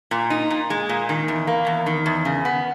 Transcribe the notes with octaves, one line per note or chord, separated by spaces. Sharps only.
A#2
D#4
A#2
G#3
A#2
D#3
E2
A#3
E2
D#3
E2
C#3
B3